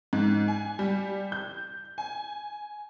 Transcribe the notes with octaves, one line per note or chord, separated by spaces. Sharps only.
G#2
G#5
G3
G6
G#5